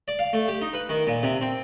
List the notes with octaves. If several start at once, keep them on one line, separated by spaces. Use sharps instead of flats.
D5
F5
A3
G4
D#4
B4
D#3
A#2
C3
C4